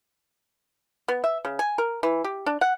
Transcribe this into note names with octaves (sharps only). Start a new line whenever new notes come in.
B3
E5
C#3
G#5
A#4
E3
G4
D4
F#5